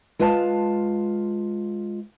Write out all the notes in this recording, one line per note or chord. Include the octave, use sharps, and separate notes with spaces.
G#3 F4 B4 F5 A5